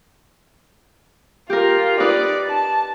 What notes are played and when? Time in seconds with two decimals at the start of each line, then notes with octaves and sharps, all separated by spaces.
1.50 F4 G4 A#4
2.00 D#4 B4 D5
2.50 A5